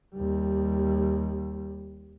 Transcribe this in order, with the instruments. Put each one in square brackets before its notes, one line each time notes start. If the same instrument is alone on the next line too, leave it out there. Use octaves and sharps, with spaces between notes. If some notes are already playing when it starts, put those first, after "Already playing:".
[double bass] D#2 G3